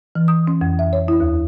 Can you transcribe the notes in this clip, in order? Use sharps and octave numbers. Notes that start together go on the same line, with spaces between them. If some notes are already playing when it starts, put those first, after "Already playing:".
E3
D#6
C#4
F2
E5
C#5
E4
D#2